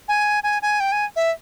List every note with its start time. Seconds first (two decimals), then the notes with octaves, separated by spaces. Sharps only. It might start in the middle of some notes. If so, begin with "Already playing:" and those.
0.08 G#5
0.43 G#5
0.62 G#5
0.80 G5
0.92 G#5
1.16 E5